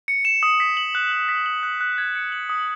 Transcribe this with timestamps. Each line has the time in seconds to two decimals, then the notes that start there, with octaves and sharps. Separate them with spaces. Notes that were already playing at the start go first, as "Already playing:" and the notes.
0.08 C#7
0.25 E7
0.43 D#6
0.60 B6
0.77 F#7
0.95 F#6
1.12 F#6
1.29 B6
1.46 F#7
1.63 F#6
1.81 F#6
1.98 G#6
2.15 C#7
2.32 F#7
2.50 D#6